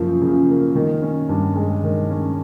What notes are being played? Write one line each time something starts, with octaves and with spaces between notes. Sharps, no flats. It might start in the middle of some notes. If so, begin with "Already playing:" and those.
Already playing: F#2 C#3 F3 A#3
C#3
A#3
D#3
C#4
G2
G#3
D#3
C#4